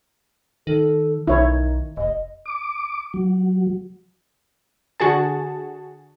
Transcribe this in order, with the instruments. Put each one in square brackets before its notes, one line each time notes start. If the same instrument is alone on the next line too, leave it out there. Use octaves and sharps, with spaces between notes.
[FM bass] D#3 [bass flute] A4
[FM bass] B1 [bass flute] D#3 [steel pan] E4 C#5
[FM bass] F1 [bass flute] D#5
[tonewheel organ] D6
F#3
[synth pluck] D3 F#4 G#4 A5